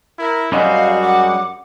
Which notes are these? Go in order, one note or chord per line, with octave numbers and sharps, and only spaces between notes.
E4 A#4
F#2 G3 G#3 F#4 D#5 F5
F#5 D6